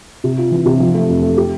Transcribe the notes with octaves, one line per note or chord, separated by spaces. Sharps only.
C3
F4
E3
C3
F3
A3
F2
A3
G4